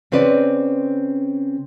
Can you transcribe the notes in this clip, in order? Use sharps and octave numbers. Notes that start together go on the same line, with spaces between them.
C#3 C4 C#4 B4 C5 D5